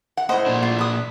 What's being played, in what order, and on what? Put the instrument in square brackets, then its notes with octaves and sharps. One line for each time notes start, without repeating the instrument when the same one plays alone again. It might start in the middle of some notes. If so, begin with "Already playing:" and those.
[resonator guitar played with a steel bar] F#5
[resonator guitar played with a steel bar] A2 F#5 [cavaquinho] C5 D#5
[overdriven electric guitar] A#2 D4
[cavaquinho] F4
B4 D#6